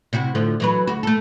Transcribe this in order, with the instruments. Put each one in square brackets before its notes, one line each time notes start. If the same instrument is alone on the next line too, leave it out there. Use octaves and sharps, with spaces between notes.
[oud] C3 E4 F#4
A2 D3 F3
E3 F#3 B4
D2 F#4
A3 A4